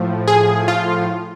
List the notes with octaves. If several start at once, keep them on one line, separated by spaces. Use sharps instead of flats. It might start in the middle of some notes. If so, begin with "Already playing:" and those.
Already playing: A2 F3
G#4
F4